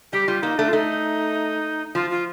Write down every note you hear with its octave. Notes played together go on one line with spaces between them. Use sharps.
G3 G4
G3 F4
A#3 D#4
A3 D4
F4
A3 D#4
F3 F4
F4